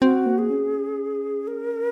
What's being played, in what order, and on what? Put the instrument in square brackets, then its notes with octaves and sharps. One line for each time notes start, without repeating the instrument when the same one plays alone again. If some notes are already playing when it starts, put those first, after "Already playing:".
[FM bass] C4 [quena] F#4
[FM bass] A#3
[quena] G#4
[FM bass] C#4
[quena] A#4